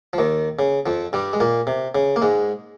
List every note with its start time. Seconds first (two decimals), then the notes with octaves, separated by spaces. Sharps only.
0.13 F3
0.18 D#2 D#3
0.59 C#3
0.86 F2 F3
1.13 G2 G3
1.33 G#3
1.40 A#2 A#3
1.67 C3
1.95 C#3
2.16 A#3
2.22 G#2 G#3